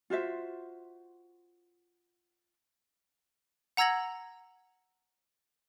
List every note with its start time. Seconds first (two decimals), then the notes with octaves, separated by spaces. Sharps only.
0.10 F4 F#4 C5 E5
3.77 F#5 A#5 E6 G#6 A#6 F#7